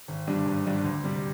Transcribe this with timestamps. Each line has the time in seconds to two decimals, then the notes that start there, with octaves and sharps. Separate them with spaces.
0.08 G#1
0.27 G2 D3 G3 D4
0.46 G#1
0.66 G2 D3 G3 D4
0.84 D2
1.04 C3 G3